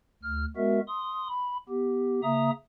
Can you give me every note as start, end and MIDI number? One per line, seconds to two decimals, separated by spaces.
0.23 0.45 38
0.23 0.45 89
0.56 0.80 56
0.56 0.80 59
0.56 0.80 66
0.56 0.80 70
0.56 0.80 76
0.88 1.28 84
0.88 1.28 87
1.29 1.57 83
1.69 2.20 59
1.69 2.20 67
2.23 2.50 49
2.23 2.50 58
2.23 2.50 76
2.23 2.50 82
2.23 2.50 87